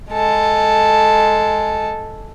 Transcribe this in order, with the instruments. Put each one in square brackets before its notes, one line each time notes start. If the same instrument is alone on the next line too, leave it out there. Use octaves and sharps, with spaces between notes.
[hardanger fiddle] G#3 A4